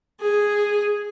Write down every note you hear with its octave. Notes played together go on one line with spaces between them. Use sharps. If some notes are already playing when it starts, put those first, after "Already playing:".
G#4